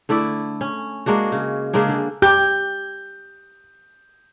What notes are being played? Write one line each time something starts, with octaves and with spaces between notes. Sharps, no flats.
D3 A3 E4 D5
C#4
G#3 A#3 D4 F#4
C#3
C#3 G#3 A#3 D4
D3
G4 G6